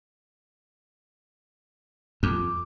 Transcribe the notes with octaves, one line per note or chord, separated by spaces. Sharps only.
F2 D6